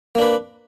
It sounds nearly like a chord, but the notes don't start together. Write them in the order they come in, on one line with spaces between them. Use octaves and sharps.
A#3 D4 B4